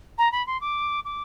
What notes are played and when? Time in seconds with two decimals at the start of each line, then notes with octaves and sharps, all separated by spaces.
0.18 A#5
0.32 B5
0.47 C6
0.61 D6
1.05 D6